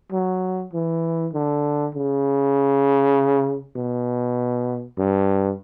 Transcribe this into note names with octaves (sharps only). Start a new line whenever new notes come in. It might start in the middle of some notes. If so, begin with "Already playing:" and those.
F#3
E3
D3
C#3
B2
G2